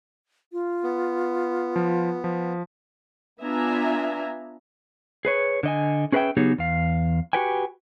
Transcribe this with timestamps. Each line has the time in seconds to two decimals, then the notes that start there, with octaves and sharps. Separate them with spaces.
0.53 F4
0.83 B3
1.76 F3
2.24 F3
3.42 B3 D4 F4 E5 G#5 A#5
5.25 G#4 B4 C#5
5.63 D3 D#5 G#5
6.12 C#4 G#4 B4 D5 E5 G5
6.37 C#3 F#3 B3 D#4 G4 G#4
6.58 E2 F5
7.33 F#4 G4 B4 G5 G#5